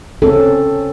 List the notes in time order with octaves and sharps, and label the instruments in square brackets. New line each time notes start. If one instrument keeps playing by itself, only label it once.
[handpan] C4 C#4 A4